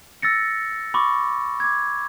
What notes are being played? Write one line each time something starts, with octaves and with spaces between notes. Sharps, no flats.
E6 A6 A#6 C#7
B5 C#6 D6
D6 G#6